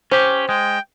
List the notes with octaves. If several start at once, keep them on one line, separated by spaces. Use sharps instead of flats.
C#4 G4 C5
G#3 G5